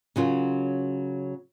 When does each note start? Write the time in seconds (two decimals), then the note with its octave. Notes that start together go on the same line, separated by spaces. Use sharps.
0.16 C#3 F#3 F4 A#4